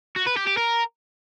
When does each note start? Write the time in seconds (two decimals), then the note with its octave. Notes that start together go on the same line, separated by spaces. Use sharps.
0.16 F#4
0.26 B4
0.37 G4
0.47 G4
0.57 A#4